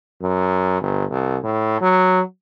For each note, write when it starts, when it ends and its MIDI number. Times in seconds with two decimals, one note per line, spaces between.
0.22 0.81 42
0.82 1.05 31
1.10 1.38 36
1.44 1.80 45
1.81 2.21 54